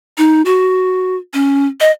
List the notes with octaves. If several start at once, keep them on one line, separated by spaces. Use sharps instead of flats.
D#4
F#4
C#4
D#5